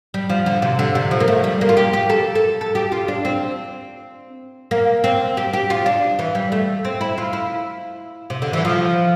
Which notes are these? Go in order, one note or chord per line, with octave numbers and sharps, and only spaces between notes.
G3
F3
D3
C3
D3
C3
F3
A#3
A3
G3
A#3
F4
G4
G4
A4
A4
A4
G4
F4
D4
C4
A#3
C4
G4
G4
F4
D4
E3
G3
A3
C4
E4
F4
E4
C3
D3
E3
F3